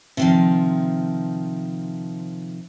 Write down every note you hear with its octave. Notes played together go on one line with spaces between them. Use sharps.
C3 D#3 F3